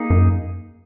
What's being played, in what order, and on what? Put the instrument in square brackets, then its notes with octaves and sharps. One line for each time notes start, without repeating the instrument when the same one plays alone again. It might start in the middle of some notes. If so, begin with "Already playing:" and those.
Already playing: [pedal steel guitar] A#3 D#4 G#4
[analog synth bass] F#2